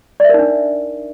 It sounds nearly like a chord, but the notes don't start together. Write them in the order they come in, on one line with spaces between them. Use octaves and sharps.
D5 E5 A#4 D#4 D4